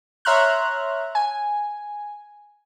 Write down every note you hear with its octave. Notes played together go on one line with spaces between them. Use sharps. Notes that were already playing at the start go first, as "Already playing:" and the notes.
C#5 E5 A#5 C6 F6 F#6
G#5